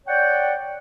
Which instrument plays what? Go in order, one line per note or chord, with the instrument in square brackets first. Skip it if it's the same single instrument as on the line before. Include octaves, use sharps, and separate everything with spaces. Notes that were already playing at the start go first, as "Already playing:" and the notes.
[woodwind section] C#5 D5 F#5 G5